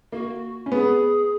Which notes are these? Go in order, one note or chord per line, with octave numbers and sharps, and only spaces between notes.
A#3 F#4
C#4
B3 G#4